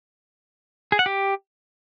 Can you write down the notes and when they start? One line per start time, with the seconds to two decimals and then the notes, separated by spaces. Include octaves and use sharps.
0.92 G#4
0.99 F#5
1.06 G4